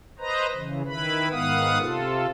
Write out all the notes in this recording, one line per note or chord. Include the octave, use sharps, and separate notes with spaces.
B4 C5 D#5 A#5
C#3 E3
D#3 E4 B4 B5
G#2 D#3 B3 F5 F#5 D#6
C3 F4 A4